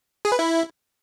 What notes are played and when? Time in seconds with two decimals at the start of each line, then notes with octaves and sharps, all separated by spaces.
0.25 G#4
0.32 B4
0.39 E4